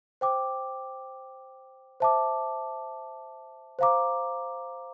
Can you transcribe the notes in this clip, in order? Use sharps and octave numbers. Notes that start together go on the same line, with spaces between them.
C5 G5 D6
C5 E5 A5 D6
C5 F5 A#5 D6